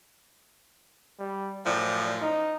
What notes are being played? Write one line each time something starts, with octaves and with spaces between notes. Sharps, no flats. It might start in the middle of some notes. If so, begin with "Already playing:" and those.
G3
F#2 A2 F3 D5
D#4